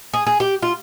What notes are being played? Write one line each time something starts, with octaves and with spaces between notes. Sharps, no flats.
G#4
G#4
G4
F4